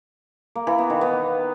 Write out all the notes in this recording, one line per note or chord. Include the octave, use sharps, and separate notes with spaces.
A#3
E3
B3
D#3
B3